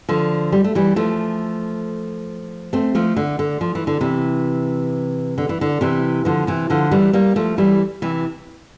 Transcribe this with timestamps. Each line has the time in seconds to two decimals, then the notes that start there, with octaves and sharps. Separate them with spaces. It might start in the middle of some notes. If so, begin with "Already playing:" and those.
0.09 D3 F3
0.52 G3
0.64 A3
0.75 E3 G3
0.96 F3 A3
2.73 A3 C4
2.95 F3 A3
3.16 D3
3.39 D3
3.61 F3
3.75 E3
3.87 D3
4.01 C3 E3
5.38 D3
5.49 E3
5.61 D3
5.81 C3 E3
6.25 D3 F3
6.47 C3 E3
6.70 D3 F3
6.91 E3 G3
7.13 G3 A#3
7.36 F3 A3
7.58 E3 G3
8.02 C3 E3